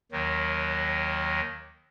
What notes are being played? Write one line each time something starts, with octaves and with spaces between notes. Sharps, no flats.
D#2 D#3 F#3